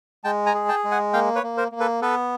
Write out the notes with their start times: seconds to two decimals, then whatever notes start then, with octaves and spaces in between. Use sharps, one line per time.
0.24 G#3 G5 A5
0.46 G#5 A#5
0.54 G#4
0.68 G5 A5
0.84 G#3
0.91 F#5 G#5
1.13 A#3 F5 G5
1.35 B4 C#5
1.43 A#3
1.57 A#4 C5
1.72 A#3
1.80 A4 B4
2.02 B3 A4 B4